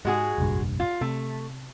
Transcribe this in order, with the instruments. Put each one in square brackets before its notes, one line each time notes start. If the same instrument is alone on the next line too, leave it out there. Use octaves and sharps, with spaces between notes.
[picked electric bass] G#2 [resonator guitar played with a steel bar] G#3 F#4 G#4
[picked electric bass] F1 A#1 G2
[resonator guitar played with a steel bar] F4
[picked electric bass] C3 [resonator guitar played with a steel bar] A3